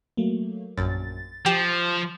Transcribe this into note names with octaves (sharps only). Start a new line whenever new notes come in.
F#3 A3 A#3
A#1 F#2 A6
F3 G4 D6